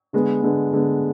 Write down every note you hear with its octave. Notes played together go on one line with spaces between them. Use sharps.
D3 G#3 B3
D3 G#3 B3
D3 G#3 B3